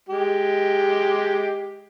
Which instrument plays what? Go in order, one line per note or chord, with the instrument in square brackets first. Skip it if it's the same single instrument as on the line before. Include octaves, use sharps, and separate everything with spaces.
[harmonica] G#3 G4